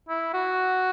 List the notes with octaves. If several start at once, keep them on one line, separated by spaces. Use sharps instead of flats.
E4
F#4